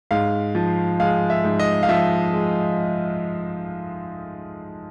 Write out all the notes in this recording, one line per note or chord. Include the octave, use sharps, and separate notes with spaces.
G#2 F5
F3
G#3 F5
E5
G#2
D#5
F5
F3 E5
G#3